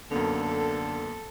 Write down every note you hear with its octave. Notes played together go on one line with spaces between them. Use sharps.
F#2 D3 A#3 B3 A4